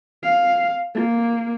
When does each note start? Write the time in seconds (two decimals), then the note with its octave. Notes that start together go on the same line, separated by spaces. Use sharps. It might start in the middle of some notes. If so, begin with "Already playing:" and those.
0.23 F5
0.94 A#3